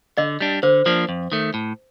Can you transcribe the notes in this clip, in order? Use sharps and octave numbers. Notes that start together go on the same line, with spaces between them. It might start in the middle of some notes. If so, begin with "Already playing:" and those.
D3 D#5
G3 D4
D3 C5
F3 A#3 D4
F2
D#3 A3
A2